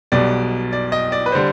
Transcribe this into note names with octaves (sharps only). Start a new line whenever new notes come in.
B1 B2 G3 D5
D5
D#5
D5
B4
D3 G3 C5